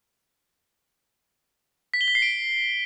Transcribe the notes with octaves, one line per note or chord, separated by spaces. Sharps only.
B6
G7
B6
C7
D7